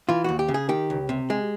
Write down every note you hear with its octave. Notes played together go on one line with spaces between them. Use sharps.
E3 F4
D#2 F#4
G4
C#3
G#4
D#3 G4
C#2
C3
G#3